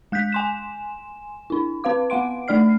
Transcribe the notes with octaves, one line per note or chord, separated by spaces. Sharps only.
G#3 F#6 G6 B6
G#5 C6 E7
D4 E4
C4 B4 F5 D6
B3 F5 F#5 C6 D7
A3 D4 D5 F6 C7